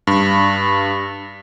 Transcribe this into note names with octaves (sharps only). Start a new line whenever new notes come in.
G2